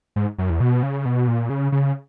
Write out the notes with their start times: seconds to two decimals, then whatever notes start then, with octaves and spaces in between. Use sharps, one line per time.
0.16 G#2
0.38 F#2
0.50 E2
0.60 B2
0.83 C#3
1.05 B2
1.28 A#2
1.50 C#3
1.72 C#3